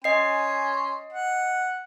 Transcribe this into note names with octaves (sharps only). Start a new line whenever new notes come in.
C#4 D#5 G#5 C6 C7
F#5